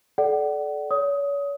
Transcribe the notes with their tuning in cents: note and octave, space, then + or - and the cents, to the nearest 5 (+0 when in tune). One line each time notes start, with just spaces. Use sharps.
A4 -30 D5 +0 F#5 +30
C#5 +35 D#6 +20